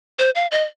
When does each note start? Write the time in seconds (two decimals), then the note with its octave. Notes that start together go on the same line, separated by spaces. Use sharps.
0.19 C5
0.35 F5
0.51 D#5